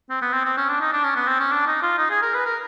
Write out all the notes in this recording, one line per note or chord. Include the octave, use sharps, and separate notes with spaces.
C4
B3
C4
C4
C#4
D4
D#4
D4
C#4
B3
C4
C#4
D4
D#4
F4
D#4
G#4
A#4
B4
A#4